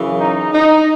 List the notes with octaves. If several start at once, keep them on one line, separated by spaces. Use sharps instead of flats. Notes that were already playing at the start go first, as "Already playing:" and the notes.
Already playing: F#2 C#3 E3
D#4
D#4